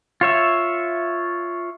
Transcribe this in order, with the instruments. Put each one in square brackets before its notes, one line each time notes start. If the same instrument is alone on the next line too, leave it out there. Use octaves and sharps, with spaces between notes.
[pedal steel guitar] F4 C#5 E5